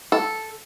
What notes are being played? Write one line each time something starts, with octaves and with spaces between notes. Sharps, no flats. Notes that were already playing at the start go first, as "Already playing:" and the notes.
A4